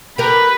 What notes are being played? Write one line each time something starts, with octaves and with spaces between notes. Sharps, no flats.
G4 A#4 B4